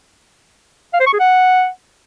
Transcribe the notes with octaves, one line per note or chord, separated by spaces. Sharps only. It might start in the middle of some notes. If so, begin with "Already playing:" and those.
F5
C5
C#6
G#4
F#5